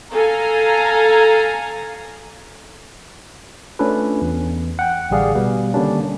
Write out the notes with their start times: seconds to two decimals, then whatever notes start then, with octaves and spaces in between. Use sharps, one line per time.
0.12 A4 F5 G#5 A#5
3.79 A3 C#4 D4 F4 A4 B4
4.22 E2
4.79 F#5 G5
5.10 A1 D3 G3 G#4 D5 F5
5.35 B2 G3 B3
5.74 D3 D#3 G3 A#3 C#4 D4